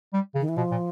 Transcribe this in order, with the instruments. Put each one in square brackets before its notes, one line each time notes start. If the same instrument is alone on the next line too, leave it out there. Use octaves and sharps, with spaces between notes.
[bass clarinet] G3
C#3
[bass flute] D#3
E3
[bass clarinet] B2 [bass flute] F3
[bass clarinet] A#2